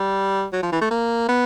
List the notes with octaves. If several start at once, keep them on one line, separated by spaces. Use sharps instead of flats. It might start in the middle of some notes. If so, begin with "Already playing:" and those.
Already playing: G3
F#3
F3
E3
A3
A#3
B3